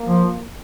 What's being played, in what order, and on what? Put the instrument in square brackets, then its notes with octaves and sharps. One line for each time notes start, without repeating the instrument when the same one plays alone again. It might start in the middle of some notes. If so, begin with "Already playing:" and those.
Already playing: [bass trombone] A#3
[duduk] F3